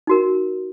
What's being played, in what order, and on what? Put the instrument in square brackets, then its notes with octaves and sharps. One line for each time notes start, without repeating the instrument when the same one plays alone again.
[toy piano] D#4 F#4 A#4